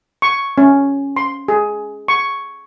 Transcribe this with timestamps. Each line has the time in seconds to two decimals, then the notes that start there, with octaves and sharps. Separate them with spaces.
0.22 C#6
0.58 C#4
1.17 C6
1.48 G#4
2.08 C#6